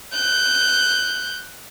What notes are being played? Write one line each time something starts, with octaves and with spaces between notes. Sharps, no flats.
F#6 G6